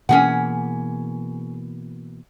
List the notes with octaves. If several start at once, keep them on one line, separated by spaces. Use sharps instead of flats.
B2 E3 A#3 C#4 G#4 F#5